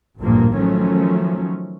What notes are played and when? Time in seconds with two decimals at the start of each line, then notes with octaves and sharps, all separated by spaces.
0.19 A1 D2 G2 A#2 F3 A#3
0.57 D#3 F3 F#3 A3 C#4